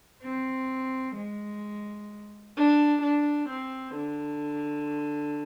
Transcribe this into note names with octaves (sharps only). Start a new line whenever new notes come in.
C4
G#3
D4
D4
C4
D3